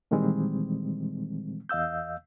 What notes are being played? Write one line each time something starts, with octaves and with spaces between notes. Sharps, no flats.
A#2 D#3 E3 G3 G#3 C4
E2 D#5 F5 E6 G6